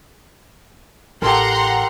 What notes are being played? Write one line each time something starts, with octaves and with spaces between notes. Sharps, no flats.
A1 G4 A4 A#4 F#5 A#5 C6